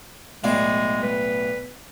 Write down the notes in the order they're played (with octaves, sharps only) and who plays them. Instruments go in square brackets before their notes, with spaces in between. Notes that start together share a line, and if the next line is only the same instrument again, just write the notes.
[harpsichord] B1 A2 D5 [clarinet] G#3
[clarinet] B4